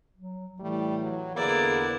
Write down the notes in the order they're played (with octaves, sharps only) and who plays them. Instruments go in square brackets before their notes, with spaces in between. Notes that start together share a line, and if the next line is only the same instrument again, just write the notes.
[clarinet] F#3
[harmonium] A2 A3 [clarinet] E3 [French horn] G3
[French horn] F#3
[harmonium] E2 D3 B4 [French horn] A#3 [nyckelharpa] E4 D5 [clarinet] G#4